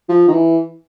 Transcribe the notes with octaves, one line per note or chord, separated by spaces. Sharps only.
F3
D#3
E3